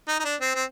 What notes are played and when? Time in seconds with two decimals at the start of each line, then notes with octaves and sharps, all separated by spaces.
0.08 D#4
0.19 D#4
0.24 D4
0.41 C4
0.55 C4